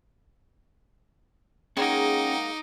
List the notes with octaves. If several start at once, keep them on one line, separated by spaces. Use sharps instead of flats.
G#3 A#3 C#4 D#4 F#5 G5 D6